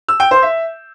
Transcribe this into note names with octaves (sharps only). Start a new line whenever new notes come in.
E6
G5
C5
E5